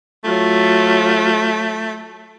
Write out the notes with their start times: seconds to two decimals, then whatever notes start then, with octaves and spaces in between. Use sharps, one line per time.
0.24 F#3 A3 F4